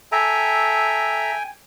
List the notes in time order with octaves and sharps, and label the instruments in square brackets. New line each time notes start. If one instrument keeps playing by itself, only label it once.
[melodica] A4 E5 A#5 [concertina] G5 G#5